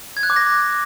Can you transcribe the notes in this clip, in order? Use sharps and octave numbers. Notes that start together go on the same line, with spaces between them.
G#6
F#6
D6
A#6